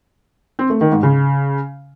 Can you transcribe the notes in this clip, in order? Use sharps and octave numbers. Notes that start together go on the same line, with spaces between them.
C4
A3
D#3
G#2
C#3